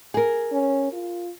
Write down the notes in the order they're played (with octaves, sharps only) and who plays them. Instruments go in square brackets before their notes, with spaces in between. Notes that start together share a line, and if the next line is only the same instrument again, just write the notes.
[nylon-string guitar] G#4 A#4
[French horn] C#4
F4